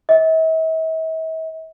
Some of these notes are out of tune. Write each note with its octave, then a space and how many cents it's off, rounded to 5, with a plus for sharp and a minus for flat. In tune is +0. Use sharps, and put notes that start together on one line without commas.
E5 -45